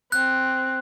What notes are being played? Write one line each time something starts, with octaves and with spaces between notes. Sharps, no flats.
C4 F#6